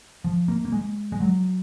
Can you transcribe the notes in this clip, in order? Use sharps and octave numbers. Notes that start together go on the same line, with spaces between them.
F3
A#3
A#3
G#3
G#3
F#3